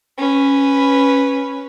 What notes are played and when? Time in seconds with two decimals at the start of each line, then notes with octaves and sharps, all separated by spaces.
0.18 C#4 B4